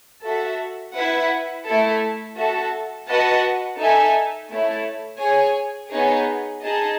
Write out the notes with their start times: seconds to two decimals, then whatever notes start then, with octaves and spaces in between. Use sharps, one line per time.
0.24 F#4 A4 E5
0.95 E4 B4 F#5
1.66 A3 E4 A4
2.37 F#4 A4 E5 A5
3.08 F#4 B4 D#5 F#5 A5
3.79 D#4 A4 E5 G#5
4.50 A3 E4 A4 C#5
5.20 G#4 C#5 G#5
5.93 B3 D#4 G#4 C#5
6.63 D#4 G#4 D#5 A5